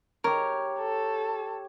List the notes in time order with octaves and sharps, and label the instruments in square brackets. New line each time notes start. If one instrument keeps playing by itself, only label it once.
[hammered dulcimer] G4 C#5 [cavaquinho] A#4
[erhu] A4